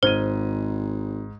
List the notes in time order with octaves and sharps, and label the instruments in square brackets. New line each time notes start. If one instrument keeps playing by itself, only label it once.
[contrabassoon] G#1 [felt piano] G#2 G#6 D#7 [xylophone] C5